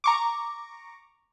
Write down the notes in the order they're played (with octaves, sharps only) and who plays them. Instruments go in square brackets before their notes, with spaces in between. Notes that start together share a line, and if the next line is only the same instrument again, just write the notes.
[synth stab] A#5 C#6 D6